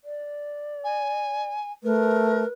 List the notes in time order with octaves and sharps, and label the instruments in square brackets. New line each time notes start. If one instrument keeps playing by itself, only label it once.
[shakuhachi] D5
[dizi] G#5
[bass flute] A3 [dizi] A#4 [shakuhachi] B4